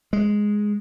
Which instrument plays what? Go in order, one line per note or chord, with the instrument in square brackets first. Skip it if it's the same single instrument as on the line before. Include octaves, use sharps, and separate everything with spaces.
[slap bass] G#3